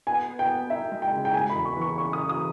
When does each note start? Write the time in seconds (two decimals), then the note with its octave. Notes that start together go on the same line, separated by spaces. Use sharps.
0.07 B3 G#5
0.28 B3
0.39 G5
0.49 B3
0.70 D#4 E5
0.92 G#3
1.02 G5
1.12 C#3
1.25 G5
1.33 C#3 G#5
1.50 B5
1.55 E2
1.65 C#6
1.76 E3 C#6
1.98 C#3 C#6
2.13 D#6
2.18 C#3
2.29 D#6